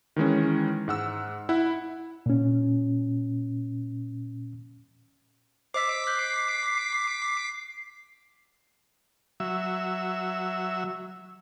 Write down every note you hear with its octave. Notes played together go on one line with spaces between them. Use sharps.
D#3 E3 G#3 C#4
G#2 F#5 E6
E4 E5 F#5
A#2 C#4
C5 D#5 D6 E6 B6 C7
F#6 G6
F#3 E5